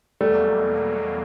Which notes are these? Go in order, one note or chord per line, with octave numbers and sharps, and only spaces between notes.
E2 B2 F#3 G3 A3 A#3